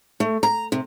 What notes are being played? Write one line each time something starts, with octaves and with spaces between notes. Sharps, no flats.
A3
A#5
C3